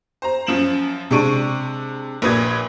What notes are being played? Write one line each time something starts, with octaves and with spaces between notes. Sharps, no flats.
C5 A#5
F#2 F3 E7 F#7
C3 G#3 D4 C#6 D7 D#7
A#1 A#2 B4 D#6 G#6